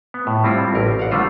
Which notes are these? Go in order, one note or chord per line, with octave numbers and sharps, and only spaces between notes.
B3
A2
G3 C4 E4 F4
A1 A#4
F5 F#5
D3 G3 A3 F4 C5